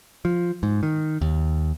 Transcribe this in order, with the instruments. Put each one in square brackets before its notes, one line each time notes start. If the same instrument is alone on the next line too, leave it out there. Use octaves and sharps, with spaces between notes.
[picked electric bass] F3
G#2
D#3
D#2